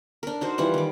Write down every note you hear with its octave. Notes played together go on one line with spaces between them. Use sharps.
D4 A#4
D#4 F#4 C5
E3 F3 G3 F#5
D#3 D6